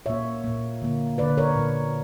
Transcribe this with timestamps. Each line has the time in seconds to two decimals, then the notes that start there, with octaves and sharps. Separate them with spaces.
0.06 A#2 A#3 C#5 E5
0.44 A#2 A#3
0.82 D3 A#3
1.18 A#3 B4 D5
1.22 D3
1.37 A#4 C#5
1.55 A#2 A#3